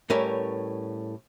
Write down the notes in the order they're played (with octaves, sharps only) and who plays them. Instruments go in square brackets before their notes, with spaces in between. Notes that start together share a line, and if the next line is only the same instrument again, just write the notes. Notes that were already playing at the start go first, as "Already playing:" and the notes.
[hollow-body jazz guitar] A2 G3 C#4 A#4 B4 E5